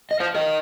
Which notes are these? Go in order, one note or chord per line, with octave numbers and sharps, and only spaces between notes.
D#5
C5 F5
A#4 D#5